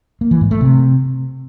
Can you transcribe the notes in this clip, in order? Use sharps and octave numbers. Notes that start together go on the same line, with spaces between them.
A#3
E3
G#2
A3
C3